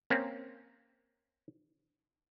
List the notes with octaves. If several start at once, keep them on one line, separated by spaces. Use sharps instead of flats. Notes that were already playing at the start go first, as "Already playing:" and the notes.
A#3 C4 C#4